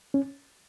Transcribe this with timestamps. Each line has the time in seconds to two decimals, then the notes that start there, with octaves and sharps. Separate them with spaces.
0.14 C#4